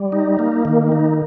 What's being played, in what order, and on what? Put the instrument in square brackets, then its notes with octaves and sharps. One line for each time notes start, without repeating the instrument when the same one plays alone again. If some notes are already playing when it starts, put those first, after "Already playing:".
Already playing: [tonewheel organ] G3
D#4
A#3
D#3
D#4